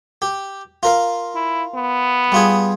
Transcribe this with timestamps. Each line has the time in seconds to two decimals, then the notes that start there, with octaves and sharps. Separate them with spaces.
0.22 G4
0.83 F4 A#4 F5
1.35 E4
1.75 B3
2.32 G3 F4 G#4